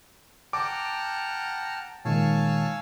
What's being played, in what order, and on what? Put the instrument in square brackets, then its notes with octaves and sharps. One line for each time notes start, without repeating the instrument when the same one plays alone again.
[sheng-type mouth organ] F#5 A#5 F6 [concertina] G5 A5 [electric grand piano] D6
[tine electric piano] A#2 D#3 G#3 [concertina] C#5 A5 [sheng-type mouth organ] F5 G#5 E6